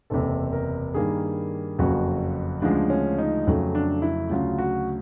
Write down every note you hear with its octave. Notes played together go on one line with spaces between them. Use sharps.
F#1 E2 C3 A4
A#4
G2 D#3 G3 A#3 G#4
F#1 F2 C#3 F#3 F#4
D2 C#3 F3 G#3 D4
C#4
D#4
F2 C#3 F#3 A3
D4
E4
D2 C#3 F#3 F4
F#4